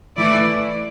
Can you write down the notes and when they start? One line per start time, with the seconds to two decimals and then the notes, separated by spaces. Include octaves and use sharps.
0.17 E3 A3 E4 D5